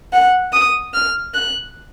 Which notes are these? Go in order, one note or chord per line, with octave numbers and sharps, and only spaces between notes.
F#5
D#6
F6
F#6